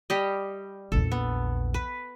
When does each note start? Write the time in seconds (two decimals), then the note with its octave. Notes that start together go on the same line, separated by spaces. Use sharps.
0.10 G3 G4 D#5
0.92 A#1 E2 A4
1.12 B3
1.74 B4